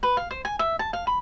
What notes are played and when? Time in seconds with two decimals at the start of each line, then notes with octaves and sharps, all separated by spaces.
0.03 B4
0.17 F5
0.31 C5
0.45 G#5
0.59 E5
0.79 A5
0.93 F5
1.07 B5